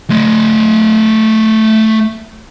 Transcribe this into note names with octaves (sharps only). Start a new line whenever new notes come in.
A3 D#5